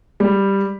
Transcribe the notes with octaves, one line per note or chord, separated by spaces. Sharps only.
G3